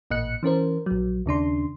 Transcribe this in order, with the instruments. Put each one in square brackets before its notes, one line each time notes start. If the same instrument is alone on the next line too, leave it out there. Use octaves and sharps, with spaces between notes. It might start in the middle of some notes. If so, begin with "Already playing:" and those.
[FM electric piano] A1 A#2 D#5 F#6 C#7
E3 C#4 A#4 C5
A#1 F#3
D#2 C#3 D4 C6